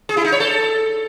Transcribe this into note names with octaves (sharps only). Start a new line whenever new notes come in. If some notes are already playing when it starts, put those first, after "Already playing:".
G#4
E4
D#4
C#5
A4